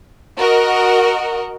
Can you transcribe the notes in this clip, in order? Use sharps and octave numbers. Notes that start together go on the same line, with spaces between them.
F#4 A#4 D#5